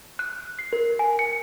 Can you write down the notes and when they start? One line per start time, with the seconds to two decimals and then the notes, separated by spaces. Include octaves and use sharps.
0.19 F#6
0.59 C7
0.73 A#4
0.99 G#5
1.19 C#7